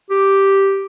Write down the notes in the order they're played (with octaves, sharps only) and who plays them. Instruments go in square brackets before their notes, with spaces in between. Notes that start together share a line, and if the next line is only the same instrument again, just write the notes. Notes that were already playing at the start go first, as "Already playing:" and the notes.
[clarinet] G4